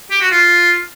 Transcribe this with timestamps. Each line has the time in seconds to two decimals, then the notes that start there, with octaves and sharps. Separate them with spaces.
0.11 G4
0.21 F#4
0.31 F4